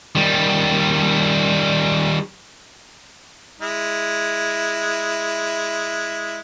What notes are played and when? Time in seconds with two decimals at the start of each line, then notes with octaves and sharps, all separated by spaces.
0.15 D#3 G3
3.60 G#3 E4